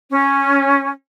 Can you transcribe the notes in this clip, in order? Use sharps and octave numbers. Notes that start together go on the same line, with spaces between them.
C#4